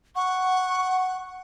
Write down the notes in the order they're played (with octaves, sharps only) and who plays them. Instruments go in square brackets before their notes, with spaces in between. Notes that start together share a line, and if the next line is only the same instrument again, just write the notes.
[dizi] F#5 [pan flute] C#6